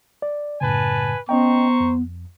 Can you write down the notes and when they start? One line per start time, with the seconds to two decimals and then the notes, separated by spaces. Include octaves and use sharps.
0.22 D5
0.61 F#2 A2 C#3 B4 G#5 A5
1.29 B3 C#4 C5 D#5 G5 A#5 C#6
1.80 F2